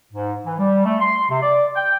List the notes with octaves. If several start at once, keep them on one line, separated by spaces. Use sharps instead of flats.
G#2
E3
G3
A3
C6
C3
D5
G5